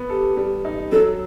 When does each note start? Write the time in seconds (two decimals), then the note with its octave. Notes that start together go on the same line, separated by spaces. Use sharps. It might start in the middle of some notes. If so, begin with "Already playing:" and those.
Already playing: B3
0.09 G4 A4
0.37 G3
0.65 D#4
0.92 F#3 A4